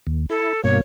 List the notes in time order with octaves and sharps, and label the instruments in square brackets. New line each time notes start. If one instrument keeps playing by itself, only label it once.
[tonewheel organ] D#2
[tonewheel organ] E4 [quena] A4
[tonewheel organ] G2 B2 A#3 [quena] C#5